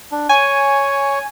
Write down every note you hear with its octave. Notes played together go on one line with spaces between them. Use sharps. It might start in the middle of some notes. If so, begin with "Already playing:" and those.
D4
C#5 G#5